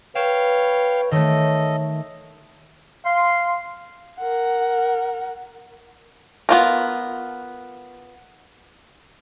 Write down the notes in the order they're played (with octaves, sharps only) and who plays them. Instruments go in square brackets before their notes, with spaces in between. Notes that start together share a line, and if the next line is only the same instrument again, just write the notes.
[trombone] B4 [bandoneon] C#5 F5 G5 [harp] E7
[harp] D#3 A3 [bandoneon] A4 D#5 [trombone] C#5
[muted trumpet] F5 [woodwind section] C6
[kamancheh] A#4 F#5
[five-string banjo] B3 F4 A#4